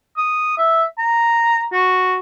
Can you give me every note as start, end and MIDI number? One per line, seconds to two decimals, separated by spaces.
0.17 0.58 87
0.58 0.84 76
0.98 1.65 82
1.73 2.17 66